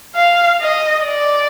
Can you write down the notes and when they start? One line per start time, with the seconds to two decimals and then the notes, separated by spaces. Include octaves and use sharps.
0.16 F5
0.61 D#5
1.06 D5